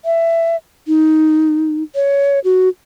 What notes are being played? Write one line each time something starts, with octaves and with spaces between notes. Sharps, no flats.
E5
D#4
C#5
F#4